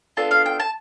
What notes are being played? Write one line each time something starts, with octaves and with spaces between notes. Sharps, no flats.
B3 D4 F4 A4 A5
F5
G5
A5